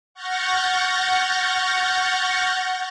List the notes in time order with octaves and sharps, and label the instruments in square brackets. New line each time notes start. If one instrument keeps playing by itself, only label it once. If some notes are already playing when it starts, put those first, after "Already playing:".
[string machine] F#5 C#6 F6 G6 A6 A#6